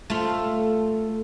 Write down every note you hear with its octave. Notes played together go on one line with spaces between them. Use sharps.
A3 F4